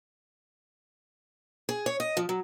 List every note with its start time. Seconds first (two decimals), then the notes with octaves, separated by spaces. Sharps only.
1.69 G#4
1.86 C#5
2.00 D#5
2.17 F3
2.29 F#3